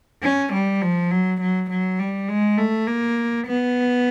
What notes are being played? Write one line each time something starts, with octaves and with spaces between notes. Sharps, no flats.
C#4
G3
F3
F#3
F#3
F#3
G3
G#3
A3
A#3
B3